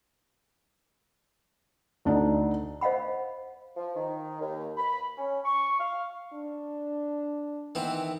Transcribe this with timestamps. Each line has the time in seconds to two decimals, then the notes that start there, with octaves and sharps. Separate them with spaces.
2.05 D2 D4 D#4
2.81 C5 D#5 F5 F#5 B5
3.76 F3
3.96 D#3
4.39 D#2
4.77 B5
5.18 C#4
5.45 C#6
5.80 F5
6.34 D4
7.75 D#3 E3 B3 C4